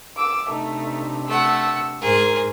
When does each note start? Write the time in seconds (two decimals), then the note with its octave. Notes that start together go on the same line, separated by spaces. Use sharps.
0.17 D6 E6
0.50 C3 A3 D4 D#4
1.28 A3 F#5 E6
2.01 G#2 G#4 A#4 C5